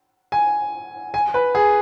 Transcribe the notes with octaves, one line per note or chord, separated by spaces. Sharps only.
G#5
G#5
B4
G#4